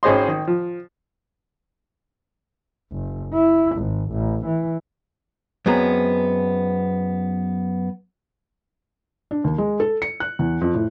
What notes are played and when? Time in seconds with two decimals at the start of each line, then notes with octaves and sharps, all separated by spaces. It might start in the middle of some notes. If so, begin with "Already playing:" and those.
0.03 G#1 C#4 G#4 C5 D#5 C6
0.28 D#3
0.47 F3
2.92 F#1
3.33 E4
3.76 G#1
4.11 A1
4.46 E3
5.66 F#2 G#3 B3 C4 A#5
9.31 D4
9.44 D#2
9.58 G#3
9.80 A4
10.02 C#7
10.20 F#6
10.39 E2
10.61 F2
10.74 A2